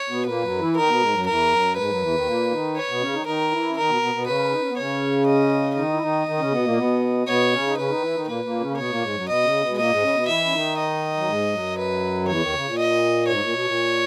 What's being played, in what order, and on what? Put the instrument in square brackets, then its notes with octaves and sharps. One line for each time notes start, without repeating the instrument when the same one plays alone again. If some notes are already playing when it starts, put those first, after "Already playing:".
Already playing: [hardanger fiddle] C#5
[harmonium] B2 B3
[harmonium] A#2 A#3 [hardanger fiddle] B4
[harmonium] F#2 F#3
E3 E4
[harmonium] D#3 D#4 [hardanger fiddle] A#4
[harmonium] B2 B3
G#2 G#3
F#2 F#3
[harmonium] E2 E3 [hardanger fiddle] A#4
[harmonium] F#2 F#3
[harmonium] G#2 G#3 [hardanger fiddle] B4
[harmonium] F#2 F#3
E2 E3
D#2 D#3
A#2 A#3
D#3 D#4
[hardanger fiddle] C#5
[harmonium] B2 B3
C#3 C#4
D#3 D#4
[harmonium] D#3 D#4 [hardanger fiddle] A#4
[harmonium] E3 E4
C#4
[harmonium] D#3 D#4 [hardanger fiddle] A#4
[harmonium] B2 B3
B2 B3
B2 B3
[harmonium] C#3 C#4 [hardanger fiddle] B4
[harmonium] D#4
C#4
B3
[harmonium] C#3 C#4 [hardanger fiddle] C#5
[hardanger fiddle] D#5
[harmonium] D#3 D#4 [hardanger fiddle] D#5
[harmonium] E4
D#3 D#4
D#3 D#4
C#3 C#4
B2 B3
A#2 A#3
B2 B3
[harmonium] B2 B3 [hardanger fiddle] C#5
[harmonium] C#3 C#4
D#4
[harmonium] C#3 C#4 [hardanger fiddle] B4
[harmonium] D#3 D#4
E3 E4
D#3 D#4
[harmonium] A#2 A#3 [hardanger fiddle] B4
[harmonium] A#2 A#3
C#3 C#4
A#3
[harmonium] B2 B3 [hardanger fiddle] C#5
[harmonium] A#2 A#3
G#2 G#3
F#2 F#3
[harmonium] B2 B3 [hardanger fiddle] D#5
[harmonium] C#3 C#4
B2 B3
G#3
[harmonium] A#2 A#3 [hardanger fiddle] D#5
[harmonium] G#2 G#3
C#3 C#4
B2 B3
[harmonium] E3 E4 [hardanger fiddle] E5
[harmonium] C#4
D#3 D#4
[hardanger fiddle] D#5
[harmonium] F#3
G#2 G#3
F#2 F#3
[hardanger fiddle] B4
[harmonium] D#3
[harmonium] E2 E3 [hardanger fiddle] C#5
[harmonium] D#2 D#3
C#3
A#2
[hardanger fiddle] D#5
[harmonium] G#2 [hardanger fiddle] C#5
[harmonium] A#2
B2
A#2